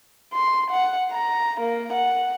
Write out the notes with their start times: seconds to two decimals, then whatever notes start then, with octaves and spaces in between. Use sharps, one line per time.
0.33 C6
0.71 F#5
1.12 A#5
1.61 A#3
1.93 F#5